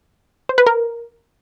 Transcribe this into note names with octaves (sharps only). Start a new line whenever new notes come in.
C5
B4
A#4